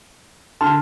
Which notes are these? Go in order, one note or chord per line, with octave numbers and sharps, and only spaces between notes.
D3 A5 C6 F6